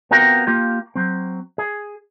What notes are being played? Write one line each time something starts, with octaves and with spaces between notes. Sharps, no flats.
B3 C4 F4 F#4 A#4 G5
A#3 F4 G4
F#3 C4
G#4